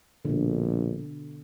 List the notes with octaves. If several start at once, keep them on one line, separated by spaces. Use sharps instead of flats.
A#1 B2 D3